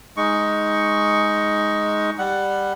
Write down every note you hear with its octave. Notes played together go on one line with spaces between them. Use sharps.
G#3 D#4 C#6
G3 F#5